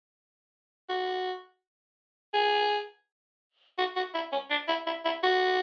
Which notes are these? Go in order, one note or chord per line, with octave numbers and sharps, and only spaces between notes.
F#4
G#4
F#4
F#4
E4
C#4
D4
E4
E4
E4
F#4